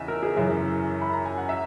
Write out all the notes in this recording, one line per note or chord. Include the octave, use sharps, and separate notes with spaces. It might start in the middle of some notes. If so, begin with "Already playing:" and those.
Already playing: E2 C#3 D#5 E5
A#4
G#4
F#2 C#3 E3 E5
B5
A#5
G#5
F#5
E5